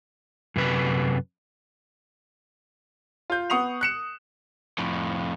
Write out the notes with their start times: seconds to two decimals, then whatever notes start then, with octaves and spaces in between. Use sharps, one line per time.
0.56 F#2 C3 B4
3.30 F4 G6
3.50 B3 F#5 C#6 D#6 C7 F7
3.81 F#6 C#7 E7
4.78 F2 A2